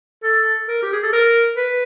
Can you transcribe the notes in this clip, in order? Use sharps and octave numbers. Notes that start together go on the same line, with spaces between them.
A4
A#4
G4
G#4
A4
A#4
B4